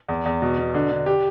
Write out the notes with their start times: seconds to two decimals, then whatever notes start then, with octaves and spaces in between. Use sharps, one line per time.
0.08 E2
0.26 E2
0.42 B2
0.58 B2
0.74 D3
0.91 D3
1.06 G4